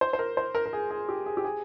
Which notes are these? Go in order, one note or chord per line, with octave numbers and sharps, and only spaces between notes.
C5
C5
A#4
C5
A#4
A#4
G#4
G#4
G4
G#4
G4
G#4